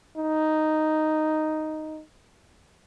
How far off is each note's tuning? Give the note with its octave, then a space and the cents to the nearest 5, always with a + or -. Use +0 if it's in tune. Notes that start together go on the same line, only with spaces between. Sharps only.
D#4 +0